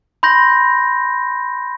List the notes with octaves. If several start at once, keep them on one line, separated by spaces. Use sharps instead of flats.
B5 C6 G6 A#6